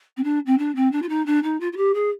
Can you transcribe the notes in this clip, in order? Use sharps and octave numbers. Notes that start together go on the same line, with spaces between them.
C4
D4
C4
D4
C4
D4
F4
D#4
D4
D#4
F4
F4
G4
G#4